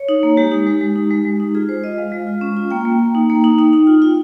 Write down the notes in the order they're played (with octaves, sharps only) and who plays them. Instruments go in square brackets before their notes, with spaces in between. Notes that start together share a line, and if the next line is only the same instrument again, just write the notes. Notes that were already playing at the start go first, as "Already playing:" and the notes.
Already playing: [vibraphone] C#5
D#4
A#3
G#3 G4
D#4
G#3
G#3
D#4
G#3
G#3
D#4
F4 G#4
G#3 C5
F4 D#5
G#3 F5
G#3
F4
C#4
F4
A#3 G5
A#3
A#3
D#4
A#3
D#4
D#4
D#4
F4
F4